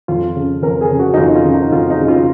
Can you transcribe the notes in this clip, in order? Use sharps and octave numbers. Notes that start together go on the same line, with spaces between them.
F2 F4
C#3
F2 A#4
G#4
C#3
F#4
D#4
F2 F4
F4
C#3
D#4
F2 F4
D#4
C#3
F4